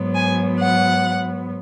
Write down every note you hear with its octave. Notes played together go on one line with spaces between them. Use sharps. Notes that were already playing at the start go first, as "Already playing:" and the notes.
Already playing: G#2 F#3 B3
G#5
F#5